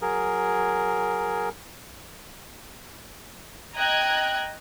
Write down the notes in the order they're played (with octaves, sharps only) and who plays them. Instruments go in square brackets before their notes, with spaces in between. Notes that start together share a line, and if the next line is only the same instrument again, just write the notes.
[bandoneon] F#3 G#4 A#4
[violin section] D#5 G5 A#5 F#6 G#6